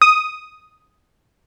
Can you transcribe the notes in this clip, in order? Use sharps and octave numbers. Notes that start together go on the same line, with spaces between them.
D#6